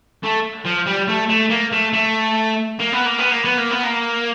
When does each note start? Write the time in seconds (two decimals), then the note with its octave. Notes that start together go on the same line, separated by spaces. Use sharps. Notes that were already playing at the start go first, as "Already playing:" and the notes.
0.23 A3
0.65 F3
0.87 G3
1.08 A3
1.29 A3
1.50 A#3
1.73 A3
1.94 A3
2.79 A#3
2.92 B3
3.05 A#3
3.19 B3
3.31 A#3
3.45 B3
3.58 A#3
3.71 B3
3.84 A#3